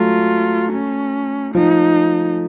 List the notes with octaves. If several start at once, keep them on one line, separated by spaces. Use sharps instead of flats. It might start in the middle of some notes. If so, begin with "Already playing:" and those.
Already playing: F#3 A3 F4
C#4
F3 D#4